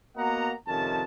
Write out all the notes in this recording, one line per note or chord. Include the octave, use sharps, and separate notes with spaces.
A#3 B3 F#4 D#5 F#5 A#5
F2 C3 D#3 G#3 C#4 A5